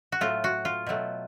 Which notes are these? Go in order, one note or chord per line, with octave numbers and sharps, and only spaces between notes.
F#4
A2 F#3 A3 F4
F#4
F4
B2 F#3 A3